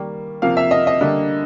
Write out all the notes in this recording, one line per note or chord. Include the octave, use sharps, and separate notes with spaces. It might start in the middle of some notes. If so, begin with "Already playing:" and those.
Already playing: D#3 G3 A#3
C3 F3 A#3 F5
E5
D#5
D#5
D3 G3 A#3